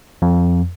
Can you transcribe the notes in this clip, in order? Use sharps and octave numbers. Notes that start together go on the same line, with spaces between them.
F2